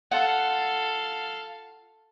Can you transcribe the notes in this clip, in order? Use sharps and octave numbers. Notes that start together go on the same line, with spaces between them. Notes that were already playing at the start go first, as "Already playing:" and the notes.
F4 A4 F5 F#5